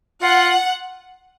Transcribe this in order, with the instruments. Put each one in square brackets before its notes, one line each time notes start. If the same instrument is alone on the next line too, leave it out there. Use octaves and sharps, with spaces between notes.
[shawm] F4 [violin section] F#5